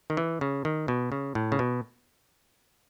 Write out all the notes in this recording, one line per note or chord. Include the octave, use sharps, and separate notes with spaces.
D#3
E3
C#3
D#3
B2
C#3
A2
C#3
B2